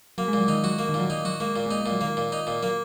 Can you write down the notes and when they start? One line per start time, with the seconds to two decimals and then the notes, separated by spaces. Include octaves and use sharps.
0.18 F#3 A#3
0.28 G#3
0.33 A#2
0.38 F#3
0.48 D#3 D#4
0.64 F#3 F#4
0.79 A#3
0.89 D#3
0.94 A#2
1.00 F#3
1.10 D#3 D#4
1.25 F#3 F#4
1.40 G#3 A#3
1.56 A#2
1.66 G#3
1.71 A#3 D#4
1.81 A#3
1.86 A#2
1.92 F#3
2.01 D#3 A#3
2.17 A#2
2.32 D#4
2.47 A#2
2.63 F#3 A#3